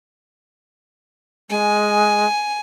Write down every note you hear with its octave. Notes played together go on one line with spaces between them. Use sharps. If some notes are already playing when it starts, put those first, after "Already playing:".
G#3 G#5